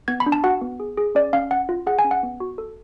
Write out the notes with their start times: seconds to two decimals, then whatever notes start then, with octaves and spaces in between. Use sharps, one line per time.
0.08 B3 G#6
0.20 B5
0.26 D4
0.32 A5
0.44 F#4 F#5
0.61 B3
0.80 G#4
0.98 G#4
1.15 C#4 D5
1.33 C#4 F5
1.51 C#4 F#5
1.69 F4
1.87 G#4 F#5
1.99 G#5
2.04 C#4
2.11 F#5
2.23 B3
2.40 F#4
2.58 A4